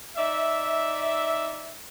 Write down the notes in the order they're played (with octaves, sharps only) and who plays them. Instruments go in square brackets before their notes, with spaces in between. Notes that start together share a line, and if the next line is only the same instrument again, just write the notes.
[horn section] D#4 D5 E5